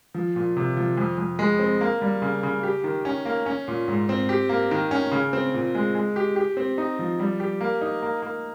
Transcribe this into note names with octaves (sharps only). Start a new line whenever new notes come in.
F3
A#2
C3
F3
F2
F2
G#3
C4
A#3
G3
C#3
C#3
G4
D#3
C#4
A#3
C#4
A#2
G#2
C4
G4
A#3
D#3
C#4
C#3
C4
A#2
G#3
G#3
G4
G4
C4
D#4
F3
G3
G4
A#3
D#4
A#3
A#3